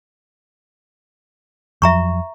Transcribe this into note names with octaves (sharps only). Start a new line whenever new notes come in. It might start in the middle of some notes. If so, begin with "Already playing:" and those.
F2 F3 F#3 E5 A#5 C#6